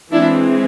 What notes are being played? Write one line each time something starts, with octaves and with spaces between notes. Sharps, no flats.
E3 G#3 C4 D4 E4